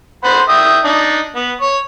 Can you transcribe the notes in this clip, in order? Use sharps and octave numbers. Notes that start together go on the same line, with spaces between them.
C5 F#5 B5
E5 G5 D#6
D4 D#4
B3
C#5